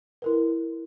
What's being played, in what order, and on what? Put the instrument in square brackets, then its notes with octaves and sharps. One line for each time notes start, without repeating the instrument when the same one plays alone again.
[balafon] E4 A#4 B4